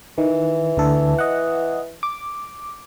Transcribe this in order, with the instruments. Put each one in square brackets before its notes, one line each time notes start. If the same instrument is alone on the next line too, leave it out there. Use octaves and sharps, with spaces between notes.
[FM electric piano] D#3 [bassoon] E3
[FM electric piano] D2 D3 A4
D#5 F#5
D6